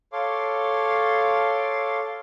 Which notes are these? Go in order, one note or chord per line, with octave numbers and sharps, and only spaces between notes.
A4 C#5 F5 C6 D6